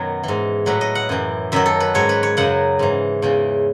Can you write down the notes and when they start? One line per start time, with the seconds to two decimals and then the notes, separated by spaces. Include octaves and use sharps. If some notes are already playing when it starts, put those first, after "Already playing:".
Already playing: F#2 B2 D#3 F#3 B4 C#5
0.23 G#2 E3
0.66 A2 F#3 B4
0.81 D#5
0.95 F#5
1.09 F#2 E3
1.52 F#2 D#3 F#3 E5
1.66 A4
1.80 B4
1.94 G#2 F#3 C#5
2.09 B4
2.23 C#5
2.37 F#2 C#3 F#3 F#5
2.79 G#2 E3
3.22 E2 C#3 E3